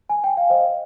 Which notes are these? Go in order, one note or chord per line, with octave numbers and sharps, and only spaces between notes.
G#5
G5
F5
C5 D#5